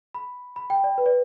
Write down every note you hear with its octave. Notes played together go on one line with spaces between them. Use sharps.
B5
B5
G5
D5
B4
D5